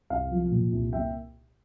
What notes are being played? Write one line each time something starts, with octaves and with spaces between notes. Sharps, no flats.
C2 F5
F3
A#2
C2
A#3 E5 G5